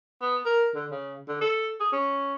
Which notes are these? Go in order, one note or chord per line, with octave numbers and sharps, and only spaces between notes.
B3
A#4
D3
C#3
D3
A4
G#4
C#4